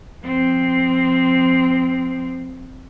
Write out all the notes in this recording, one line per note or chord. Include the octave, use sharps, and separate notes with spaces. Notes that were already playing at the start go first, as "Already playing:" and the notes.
F3 C4